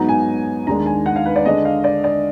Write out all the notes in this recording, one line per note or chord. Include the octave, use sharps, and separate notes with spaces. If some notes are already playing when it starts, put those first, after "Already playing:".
Already playing: G#2 F#3 B3 D#4 A#5
G#5
D#2 D#3 G#3 D4 A#5
G#5
F#5
F5
B4
D5
D3 G#3 D4 D#5
F5
D5
D5